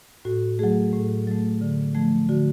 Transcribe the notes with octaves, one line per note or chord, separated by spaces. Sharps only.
A2 F#4
F#3 A3 G#4
A2
F#3 A3
D3
F3 A3
D3 F#4